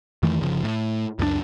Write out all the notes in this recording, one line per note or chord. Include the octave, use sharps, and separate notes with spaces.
F2 D#3 E3 A3
G1 C#3 F3
A2
C#2 F#2 F#3 D4